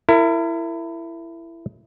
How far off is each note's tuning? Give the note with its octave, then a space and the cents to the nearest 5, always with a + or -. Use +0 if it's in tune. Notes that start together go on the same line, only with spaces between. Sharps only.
E4 +15 A#4 -35